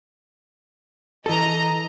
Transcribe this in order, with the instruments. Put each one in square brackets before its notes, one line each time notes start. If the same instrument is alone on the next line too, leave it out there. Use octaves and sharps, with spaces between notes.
[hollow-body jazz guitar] E3 A4 [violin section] D#5 A#5